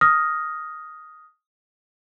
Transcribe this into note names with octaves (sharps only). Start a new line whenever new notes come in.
D#6 F6 A#6